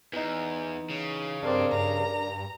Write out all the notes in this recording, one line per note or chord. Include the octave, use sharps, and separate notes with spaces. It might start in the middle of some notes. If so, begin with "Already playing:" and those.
E2 E3 D#4
C#3
G2 C4 D4 A#4 D5
G2 A#5